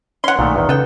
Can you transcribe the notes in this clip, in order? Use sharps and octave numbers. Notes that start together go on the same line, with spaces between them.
C#4 C#5 F#5 C6
B1 A#2 D#3 A3
E2 D#3
C#3 B3 A4 G5